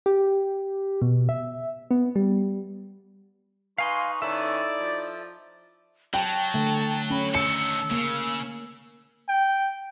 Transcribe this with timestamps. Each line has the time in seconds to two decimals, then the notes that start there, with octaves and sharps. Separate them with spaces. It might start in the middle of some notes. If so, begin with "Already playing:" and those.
0.06 G4
1.02 B2
1.29 E5
1.91 B3
2.16 G3
3.78 D#4 B4 F5 G#5 C6 C#6
4.22 D#3 C#4 D#4 E4 A4 B4 D5 E5
4.80 F3
6.14 F#3 G5 A5
6.54 D3 A3
7.10 C#4 B5
7.35 D#3 A4 E6 C#7
7.91 C#3 A#3
9.29 G5